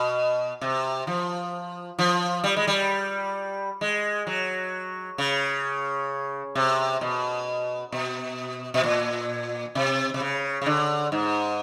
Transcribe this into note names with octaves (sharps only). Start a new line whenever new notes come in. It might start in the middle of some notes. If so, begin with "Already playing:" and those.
Already playing: B2
C3
F3
F3
G3
G#3
G3
G#3
F#3
C#3
C3
B2
B2
B2
A#2
C3
C3
C#3
C#3
D3
G#2